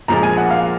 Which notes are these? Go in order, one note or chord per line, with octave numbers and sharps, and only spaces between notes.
A#2 F3 G#3 A#5
G#5
F#5
F5